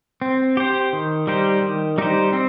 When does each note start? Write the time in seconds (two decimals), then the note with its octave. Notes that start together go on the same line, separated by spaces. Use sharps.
0.22 C4
0.57 G4 C5
0.93 D#3
1.27 G3 D#4 G4 C5
1.62 D#3
1.98 G3 D#4 G4 C5
2.33 C4